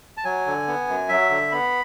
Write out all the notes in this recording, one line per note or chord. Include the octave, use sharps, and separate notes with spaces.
A5
F#3 G#5
D3
B3
F#2
F#3 E5
D3
B3 B5